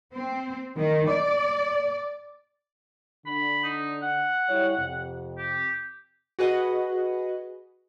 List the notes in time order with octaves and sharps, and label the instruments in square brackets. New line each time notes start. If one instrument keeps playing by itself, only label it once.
[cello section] C4
D#3
D5
[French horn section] D3 [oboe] B5
[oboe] D#4
F#5
[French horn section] G3 E4 C#5
F2 C3
[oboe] G4
[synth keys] F#4 G#4 B4 D#5 F#5